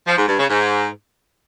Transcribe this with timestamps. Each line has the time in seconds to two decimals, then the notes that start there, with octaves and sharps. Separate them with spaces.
0.07 F3
0.17 G#2
0.28 G2
0.39 C#3
0.50 G#2